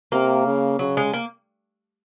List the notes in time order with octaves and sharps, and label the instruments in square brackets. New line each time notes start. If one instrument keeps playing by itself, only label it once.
[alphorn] C3 [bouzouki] A#3
[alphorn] C#3
[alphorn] C#3 [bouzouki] F#3
[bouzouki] G#3
A#3